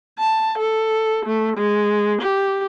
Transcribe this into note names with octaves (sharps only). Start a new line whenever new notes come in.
A5
A4
A3
G#3
G4